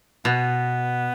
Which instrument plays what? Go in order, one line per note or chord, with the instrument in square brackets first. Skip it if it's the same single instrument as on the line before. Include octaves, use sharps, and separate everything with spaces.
[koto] B2 [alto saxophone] B3